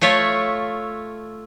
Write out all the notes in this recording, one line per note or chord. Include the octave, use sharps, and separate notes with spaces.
A3 F4 C#5 E5 A5